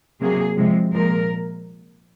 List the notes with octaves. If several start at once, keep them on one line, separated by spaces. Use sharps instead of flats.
C3 F#3 A#3 G#4
C3 F3 G#3
A#2 F3 G#3 A#4